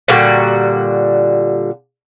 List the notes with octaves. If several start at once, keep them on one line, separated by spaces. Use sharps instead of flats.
A#2 D3 G3 F#4